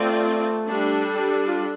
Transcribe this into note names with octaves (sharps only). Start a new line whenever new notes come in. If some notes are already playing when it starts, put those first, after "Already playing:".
Already playing: A3 C4 F4 D5
G3 D4 A4
F4